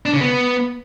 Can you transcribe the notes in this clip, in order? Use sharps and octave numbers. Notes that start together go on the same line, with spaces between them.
D4
C#3
B3